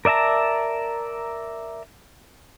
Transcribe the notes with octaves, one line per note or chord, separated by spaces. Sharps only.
A#4 D5 E5 A5 A#5